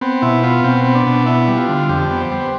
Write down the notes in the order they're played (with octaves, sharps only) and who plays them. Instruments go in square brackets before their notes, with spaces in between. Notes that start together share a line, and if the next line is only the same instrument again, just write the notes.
[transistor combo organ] B3 C4
B2 E4
B3 F4
B2 C4
B3
D4
B2
B3 E4
G3
F4
D3
F2 G4
B3
C5
G3